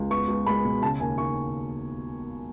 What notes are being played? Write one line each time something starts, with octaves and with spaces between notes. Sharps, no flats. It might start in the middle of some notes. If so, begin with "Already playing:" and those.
Already playing: C#2
B3 C#6
C#2
G#3 B5
B2
C#3 A5
D#2 G#5
D#2 C#6